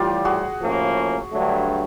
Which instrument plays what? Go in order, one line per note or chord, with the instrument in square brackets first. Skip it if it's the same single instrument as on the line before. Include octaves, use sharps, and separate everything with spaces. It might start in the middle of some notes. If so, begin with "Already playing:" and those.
Already playing: [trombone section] A2 E3 G3 [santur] F4 G4
[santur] F#4 G#4
[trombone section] A2 F3 A#3 C#4
G2 D3 F#3 A3